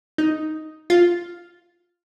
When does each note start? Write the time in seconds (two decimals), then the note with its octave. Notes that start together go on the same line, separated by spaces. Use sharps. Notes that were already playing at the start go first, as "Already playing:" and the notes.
0.18 D#4
0.90 F4